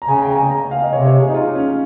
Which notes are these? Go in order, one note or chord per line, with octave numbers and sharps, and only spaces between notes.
A#5
C#3 G#5
G5
A#5
G#5
A#5
F5
D#5
C3 C#5
C#5
G#4
D#4
F4
C#4